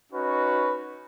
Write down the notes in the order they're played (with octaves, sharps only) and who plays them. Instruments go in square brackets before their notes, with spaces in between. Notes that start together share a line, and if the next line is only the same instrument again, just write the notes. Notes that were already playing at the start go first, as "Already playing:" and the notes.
[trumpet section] C#4 D#4 F#4 B4